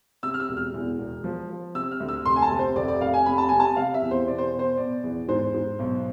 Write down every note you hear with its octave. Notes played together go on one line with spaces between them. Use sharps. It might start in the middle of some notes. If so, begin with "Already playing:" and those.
C3 E6
F6
E6
E1
F6
E2
E1
F3
F3
C3 E6
F6
D2
E6
F1 C6
G#5
A5
C3
C5
F1 D5
D5
F1 F5
G#5
C3 B5
A5
C3 G#5
A5
C3 F5
E5
E2
C5
B2 D5
C5
B2
C5
B2 D5
E2
G#2 C5
G#2
B1